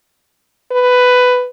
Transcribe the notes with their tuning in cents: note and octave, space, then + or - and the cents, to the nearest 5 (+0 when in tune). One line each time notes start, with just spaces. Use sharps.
B4 +10